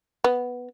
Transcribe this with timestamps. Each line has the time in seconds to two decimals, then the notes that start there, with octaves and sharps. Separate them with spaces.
0.24 B3